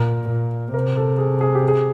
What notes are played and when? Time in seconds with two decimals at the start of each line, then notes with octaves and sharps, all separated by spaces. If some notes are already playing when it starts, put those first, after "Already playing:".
Already playing: A#2 A#4
0.29 A#2
0.74 C3 A#4
0.97 A4
1.18 G#4
1.41 G#4
1.55 G4
1.68 G#4